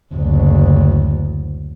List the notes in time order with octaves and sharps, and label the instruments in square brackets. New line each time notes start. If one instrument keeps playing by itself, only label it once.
[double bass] F#1 D2